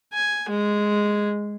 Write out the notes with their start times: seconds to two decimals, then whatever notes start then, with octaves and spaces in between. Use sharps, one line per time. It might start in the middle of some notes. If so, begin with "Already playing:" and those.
0.13 G#5
0.49 G#3